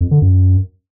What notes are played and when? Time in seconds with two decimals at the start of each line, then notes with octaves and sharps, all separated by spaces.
0.01 F2
0.11 D3
0.22 F#2